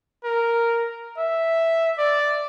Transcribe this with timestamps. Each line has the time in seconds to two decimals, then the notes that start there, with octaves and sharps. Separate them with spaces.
0.24 A#4
1.18 E5
1.98 D5